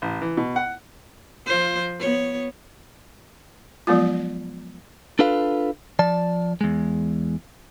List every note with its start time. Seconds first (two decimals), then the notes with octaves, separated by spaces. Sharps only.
0.02 A1
0.22 E3
0.37 B2
0.56 F#5
1.46 F3 F4 C5
1.99 B3 C#5
3.87 F3 F#3 G#3 B3 F4
5.19 D4 F4 A4 B4 F5
5.99 F3 D5 A5
6.61 E2 G#3